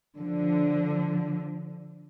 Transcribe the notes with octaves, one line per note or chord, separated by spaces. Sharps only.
D3 F3